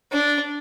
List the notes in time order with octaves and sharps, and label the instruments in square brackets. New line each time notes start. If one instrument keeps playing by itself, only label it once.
[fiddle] D4